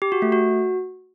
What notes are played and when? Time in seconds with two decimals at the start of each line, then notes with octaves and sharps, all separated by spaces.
0.02 G4
0.12 F#4
0.22 A3
0.32 F#4